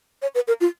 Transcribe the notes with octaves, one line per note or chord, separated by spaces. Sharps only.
C#5
B4
A#4
F4